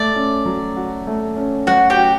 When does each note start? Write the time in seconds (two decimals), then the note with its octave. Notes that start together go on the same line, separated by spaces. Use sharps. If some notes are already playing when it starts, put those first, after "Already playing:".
Already playing: A3 D5
0.15 C#4
0.45 F#3
0.76 F#4
1.07 A3
1.36 C#4
1.67 F#3 F#4 F#5
1.90 G4 G5
1.97 F#4